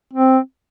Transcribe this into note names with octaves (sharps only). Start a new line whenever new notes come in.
C4